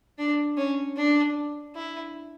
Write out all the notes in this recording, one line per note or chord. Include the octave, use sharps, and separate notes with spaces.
D4
C#4
D4
E4